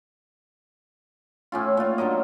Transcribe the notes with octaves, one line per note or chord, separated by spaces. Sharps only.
A2 C#4 F4
A#2 F4
D3 F#3 A#4 D#5